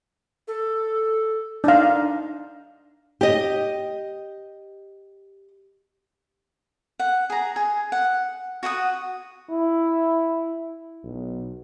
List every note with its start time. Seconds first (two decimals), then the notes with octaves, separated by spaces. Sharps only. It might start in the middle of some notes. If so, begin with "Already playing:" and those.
0.48 A4
1.64 D4 D#4 F5
3.21 G4 D#5
6.99 F#5
7.30 G#4 A#5
7.56 G#4
7.92 F#5
8.63 F#4 F#5 G5 D#6
9.50 E4
11.04 B1